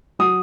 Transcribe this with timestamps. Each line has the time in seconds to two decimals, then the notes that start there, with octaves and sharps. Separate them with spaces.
0.19 F#3 D#6